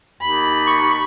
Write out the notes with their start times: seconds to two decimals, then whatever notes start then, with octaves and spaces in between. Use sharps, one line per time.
0.22 D#2 B5
0.67 C#6